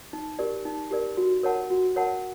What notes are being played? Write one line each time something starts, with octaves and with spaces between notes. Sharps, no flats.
D#4
G4 A#4 D5
D#4
G4 A#4 D5
F#4
A#4 C#5 F#5 A5
F#4
A#4 C#5 F#5 A5